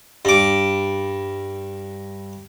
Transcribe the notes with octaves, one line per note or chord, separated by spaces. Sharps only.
G2 D6